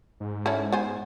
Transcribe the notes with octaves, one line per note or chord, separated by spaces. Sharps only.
G#2
C#4 E4 A4
B3 C5 G#5